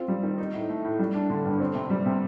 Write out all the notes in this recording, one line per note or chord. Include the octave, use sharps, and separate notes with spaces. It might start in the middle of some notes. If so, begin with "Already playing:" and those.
Already playing: C4 F4
G3
D#3
D#4
A2
A3
A2
G3
D4
D3
G2
C4
C3
G3
C3